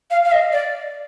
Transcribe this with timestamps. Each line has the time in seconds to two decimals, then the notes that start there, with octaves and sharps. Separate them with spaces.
0.11 F5
0.25 F5
0.32 D#5
0.52 D5